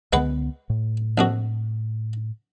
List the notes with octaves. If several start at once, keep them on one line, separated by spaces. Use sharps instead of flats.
C#2 D3 G#3 B3 B4 F#5
A2
A#1 F2 F#4